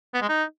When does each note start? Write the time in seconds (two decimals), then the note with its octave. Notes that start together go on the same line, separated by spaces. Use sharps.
0.14 B3
0.22 G#3
0.29 D#4